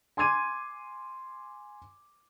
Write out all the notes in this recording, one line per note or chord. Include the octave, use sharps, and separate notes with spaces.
G#5 C6 D6 G#6 D#7